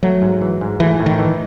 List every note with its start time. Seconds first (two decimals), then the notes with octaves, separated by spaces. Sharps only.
0.03 F#3 A3
0.22 G#2
0.42 E3
0.61 G#2
0.80 E3 A3
1.00 A2
1.06 D#3
1.19 E3